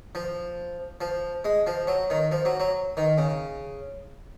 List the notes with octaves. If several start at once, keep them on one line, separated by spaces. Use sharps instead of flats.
F3
F3
G#3
F3
F#3
D#3
F3
F#3
F#3
D#3
C#3